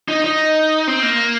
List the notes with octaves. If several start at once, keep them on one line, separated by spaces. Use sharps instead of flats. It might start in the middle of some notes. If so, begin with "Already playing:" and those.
D#4
D#4
C4
A#3